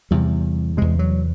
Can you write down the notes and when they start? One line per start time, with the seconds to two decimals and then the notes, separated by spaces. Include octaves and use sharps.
0.11 E2 C3 G3
0.77 E2 C3 G#3
0.99 F#3